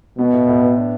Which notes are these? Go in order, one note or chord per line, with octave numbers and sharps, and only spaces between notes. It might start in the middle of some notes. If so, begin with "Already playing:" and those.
B2 B3
A2
A2
B3
D4